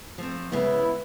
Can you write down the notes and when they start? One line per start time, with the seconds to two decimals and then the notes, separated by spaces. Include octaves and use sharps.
0.18 F3 A3 C4
0.52 C#3 G#3 B3 E4 B4